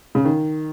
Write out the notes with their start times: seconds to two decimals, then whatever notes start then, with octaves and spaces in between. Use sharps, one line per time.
0.15 C#3
0.25 D#3